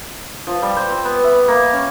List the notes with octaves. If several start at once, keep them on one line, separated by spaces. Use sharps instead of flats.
F3
G3
C5
C4
B3
E5
A#3
C#4